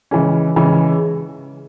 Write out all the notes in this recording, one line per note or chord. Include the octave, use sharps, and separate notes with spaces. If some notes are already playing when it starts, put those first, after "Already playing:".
C#3 E3 G#3 C#4
C#3 E3 G#3 C#4